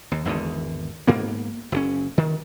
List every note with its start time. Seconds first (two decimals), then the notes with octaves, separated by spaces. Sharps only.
0.11 D#2
0.25 G#1 E2 G#2 D3
1.07 G#2 A#3 B3
1.72 F#1 C#3 C#4
2.18 D#3